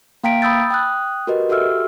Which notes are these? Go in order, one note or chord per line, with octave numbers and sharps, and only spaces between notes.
A#3 F5 G5 A#5 B6 D7
B5 D#6 E6 G6 A6
G5 D#6 F#6
F#4 G4 A#4 B4 D#5
F#4 G4 A4 E5 E6 F6